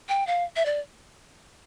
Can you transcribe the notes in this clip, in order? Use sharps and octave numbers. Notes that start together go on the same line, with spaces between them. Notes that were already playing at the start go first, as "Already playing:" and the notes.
G5
F5
E5
D5